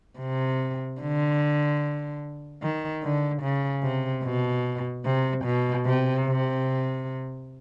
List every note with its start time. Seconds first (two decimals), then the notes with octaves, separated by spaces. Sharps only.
0.19 C3
1.01 D3
2.62 D#3
3.03 D3
3.43 C#3
3.83 C3
4.24 B2
5.05 C3
5.45 B2
5.86 C3
6.26 C3